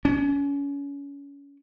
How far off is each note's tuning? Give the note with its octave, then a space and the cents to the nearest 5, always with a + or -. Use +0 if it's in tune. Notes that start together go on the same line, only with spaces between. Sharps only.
C#4 +30